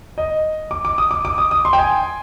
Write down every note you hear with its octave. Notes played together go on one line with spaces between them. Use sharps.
D#5
D6
D6
D#6
D6
D6
D#6
D#6
C6
G5
G#5